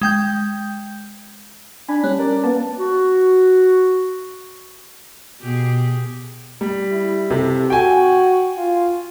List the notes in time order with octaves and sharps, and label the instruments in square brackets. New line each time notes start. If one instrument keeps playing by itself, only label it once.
[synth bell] G#3 G5 G6
[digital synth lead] D4 [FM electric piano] G#5 [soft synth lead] B5
[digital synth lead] G3 [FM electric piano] C#4 [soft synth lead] F#6
[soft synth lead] A#4 [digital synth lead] D5
[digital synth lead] A#3 [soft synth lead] B3 [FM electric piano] A5
[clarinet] F#4
[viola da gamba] B2 G4 G#4
[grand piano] G3
[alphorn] E4
[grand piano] C3 [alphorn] A4
[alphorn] F#4 [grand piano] G5 G#5
[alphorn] F4